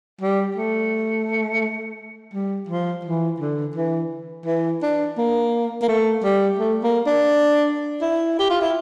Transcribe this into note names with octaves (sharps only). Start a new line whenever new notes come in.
G3
A3
G3
F3
E3
D3
E3
E3
D4
A#3
A#3
A3
G3
A3
A#3
D4
E4
G4
F4
E4